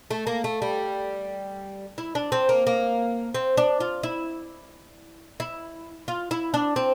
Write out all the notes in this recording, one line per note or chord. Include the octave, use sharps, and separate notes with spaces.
A3
A#3
A3
G3
E4
D4
C4
A#3
A#3
C4
D4
F4
E4
E4
F4
E4
D4
C4